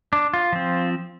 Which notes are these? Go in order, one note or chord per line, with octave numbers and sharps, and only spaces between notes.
D4
F4
F3 C4